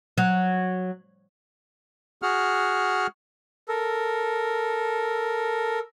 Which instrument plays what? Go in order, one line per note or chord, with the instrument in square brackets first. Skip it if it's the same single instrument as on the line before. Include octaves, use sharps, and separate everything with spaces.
[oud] F#3
[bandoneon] F#4 G#4 F#5 F6
[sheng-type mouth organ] A4 A#4